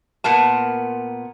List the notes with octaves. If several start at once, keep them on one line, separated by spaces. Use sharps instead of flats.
A#2 B3 A#4 A5